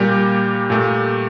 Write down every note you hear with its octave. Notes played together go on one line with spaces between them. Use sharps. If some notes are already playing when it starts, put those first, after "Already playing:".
Already playing: A#2 G3 A#3 G4
A#2 A3